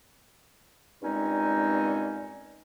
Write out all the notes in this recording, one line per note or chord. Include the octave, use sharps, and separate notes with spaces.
G2 A#2 G#3 C4 C#4 D#4